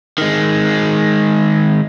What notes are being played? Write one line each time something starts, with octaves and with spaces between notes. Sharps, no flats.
D#3 G#3